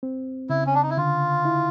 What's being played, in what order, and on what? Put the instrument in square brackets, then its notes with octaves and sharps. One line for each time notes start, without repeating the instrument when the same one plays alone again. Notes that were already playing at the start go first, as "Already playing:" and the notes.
[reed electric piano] C4
[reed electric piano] C#3 [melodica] E4
[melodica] C#4
D4
D#4
E4
[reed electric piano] D3 [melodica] F4
[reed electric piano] E4